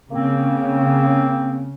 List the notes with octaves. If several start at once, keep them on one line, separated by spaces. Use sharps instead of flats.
C#3 A#3 C4